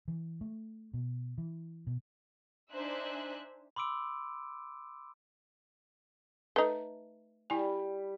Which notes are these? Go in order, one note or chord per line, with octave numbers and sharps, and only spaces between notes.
E3
A3
B2
E3
B2
D4 D#4 C5 E5 G#5 F#6
B5 C6 D6 E6 D7
A3 D#4 B4 D#5
G3 E4 G#5